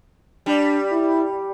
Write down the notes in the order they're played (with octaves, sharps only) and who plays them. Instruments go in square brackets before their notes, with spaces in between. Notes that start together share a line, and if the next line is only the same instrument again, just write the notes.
[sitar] G3 [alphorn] D4
[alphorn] E4